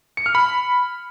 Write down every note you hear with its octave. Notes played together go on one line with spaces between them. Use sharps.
C#7
F6
B5